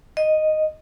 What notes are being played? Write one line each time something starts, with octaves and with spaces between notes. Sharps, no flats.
D#5